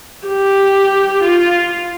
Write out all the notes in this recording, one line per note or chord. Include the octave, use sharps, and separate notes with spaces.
G4
F4